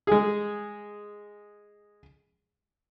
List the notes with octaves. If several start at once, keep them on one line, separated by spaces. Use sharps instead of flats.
G#3 G#4